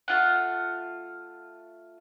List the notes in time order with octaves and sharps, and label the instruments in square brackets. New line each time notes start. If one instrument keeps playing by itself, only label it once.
[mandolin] A3 F4 F#5